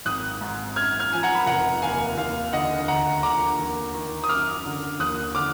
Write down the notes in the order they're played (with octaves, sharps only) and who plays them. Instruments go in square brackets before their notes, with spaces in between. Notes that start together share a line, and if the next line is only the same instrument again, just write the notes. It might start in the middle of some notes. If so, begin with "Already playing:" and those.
[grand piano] G#1 D#6 F#6
G#2
F#2 F6 G#6
F6 G#6
F3 G#5
F#5 A#5
B5
F1 F#5 A#5
D#2 F5 G#5
D#2 F5
D3 D#5 F#5
D2 F#5 A#5
D3 A#5 D6
D#2
D#3
D#6
F#2 D6 F6
D3
D#2 D#6 F#6
D3 D6 F6